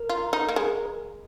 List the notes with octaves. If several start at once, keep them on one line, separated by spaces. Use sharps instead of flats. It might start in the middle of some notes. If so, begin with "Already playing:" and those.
Already playing: A#4
F4
D#4
A#3
G#3